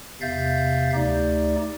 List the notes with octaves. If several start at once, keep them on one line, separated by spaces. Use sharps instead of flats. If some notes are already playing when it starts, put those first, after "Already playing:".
E2 C3 E5 F5 G6 A6
D2 A3 D#4 G4 D5